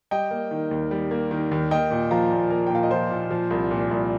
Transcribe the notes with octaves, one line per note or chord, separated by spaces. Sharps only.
G3 D#5 G5
A#3
D#3
D#2
G3
A#3
D#3
D#2
A#3 D#5 G5
A#2
F3 F5 A#5
A#2
A#3 A#4
G5
A#2 F5
D#5
F3 C5
A#2
F3
C2
A#2
C2